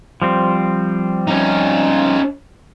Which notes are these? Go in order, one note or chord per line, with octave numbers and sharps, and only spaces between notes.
F3 G3 C4
C#4 D#4